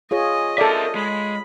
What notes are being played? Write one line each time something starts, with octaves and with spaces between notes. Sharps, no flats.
F4 G#4 C#5 D#5
A4 A#4 D5 E5
G#3 B5